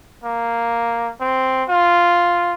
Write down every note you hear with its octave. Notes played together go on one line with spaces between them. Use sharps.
A#3
C4
F4